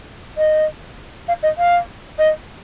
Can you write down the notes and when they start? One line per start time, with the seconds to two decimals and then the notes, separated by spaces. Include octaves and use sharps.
0.37 D#5
1.28 F5
1.43 D#5
1.58 F5
2.18 D#5